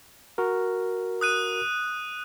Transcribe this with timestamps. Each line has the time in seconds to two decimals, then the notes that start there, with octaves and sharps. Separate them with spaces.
0.38 F#4 A#4
1.21 D#6 F#6 D#7